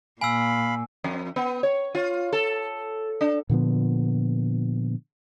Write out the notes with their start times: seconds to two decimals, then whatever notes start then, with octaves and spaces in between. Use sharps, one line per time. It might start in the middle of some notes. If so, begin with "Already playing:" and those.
0.21 A#2 F5 G#5 B5 E6
1.04 F2
1.36 B3
1.63 C#5
1.95 F4
2.33 A4
3.21 D4
3.50 A#2 D3 F3 B3